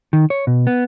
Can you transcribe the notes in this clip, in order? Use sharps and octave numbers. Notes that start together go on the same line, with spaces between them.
D#3
C#5
B2
B3